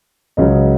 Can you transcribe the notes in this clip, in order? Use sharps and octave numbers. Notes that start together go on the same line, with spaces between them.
C#2 C#3 F#3 D#5